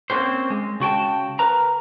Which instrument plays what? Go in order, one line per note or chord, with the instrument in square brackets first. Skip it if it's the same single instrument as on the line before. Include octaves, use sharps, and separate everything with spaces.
[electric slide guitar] A#3 C4 C#4 F#4 G4 C5
G#3
C#3 F#4 G5 A5
A#4 B4 A#5